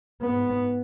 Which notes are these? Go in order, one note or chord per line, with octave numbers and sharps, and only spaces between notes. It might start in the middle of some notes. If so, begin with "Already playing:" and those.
G#2 B3